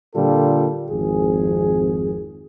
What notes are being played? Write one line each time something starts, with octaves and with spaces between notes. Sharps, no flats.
A#2 D3 G3 F4 A4
G#1 F2 G#4